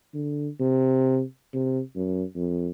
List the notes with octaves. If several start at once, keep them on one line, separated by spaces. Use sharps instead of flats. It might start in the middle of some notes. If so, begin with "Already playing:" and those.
D3
C3
C3
F#2
F2